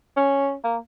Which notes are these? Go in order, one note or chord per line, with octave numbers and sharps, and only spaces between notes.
C#4
A#3